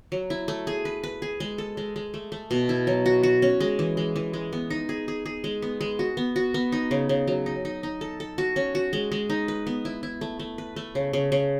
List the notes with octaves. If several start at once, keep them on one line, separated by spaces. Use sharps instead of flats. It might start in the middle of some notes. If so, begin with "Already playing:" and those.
F#3
E4
A3
G#4
B4
B4
G#4
G#3
A4
G#3
G#3
A3
A3
B2
E4
F#3
F#4
F#4
C#4
G#3
E3
G#3
E3
G#3
B3
D#4
G#4
G#4
G#4
G#3
B3
G#3
F#4
B3
F#4
B3
D#4
C#3
C#3
F#3
D#4
D#4
D#4
A4
A4
F#4
C#4
F#4
G#3
G#3
D#4
B4
B3
E4
E4
A3
A3
B4
A3
C#3
C#3
C#3